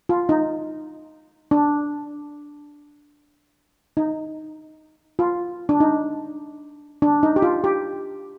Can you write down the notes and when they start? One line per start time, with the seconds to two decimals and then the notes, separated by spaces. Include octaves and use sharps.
0.09 F4
0.29 D#4
1.51 D4
3.97 D#4
5.19 F4
5.69 D4
5.80 D#4
7.02 D4
7.23 D#4
7.36 G4
7.42 F4
7.64 G4